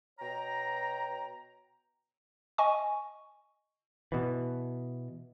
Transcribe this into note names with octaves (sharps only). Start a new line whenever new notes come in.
B2 C#5 G5 A#5
D#5 G#5 C#6
B2 E3